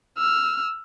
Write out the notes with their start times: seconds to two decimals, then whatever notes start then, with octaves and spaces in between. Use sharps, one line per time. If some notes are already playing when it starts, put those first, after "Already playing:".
0.18 E6 F6